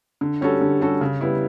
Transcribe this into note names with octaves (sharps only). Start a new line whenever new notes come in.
D3
G3 C#4 F#4 A4
D3
G3 C#4 F#4 A4
C#3
G3 B3 E4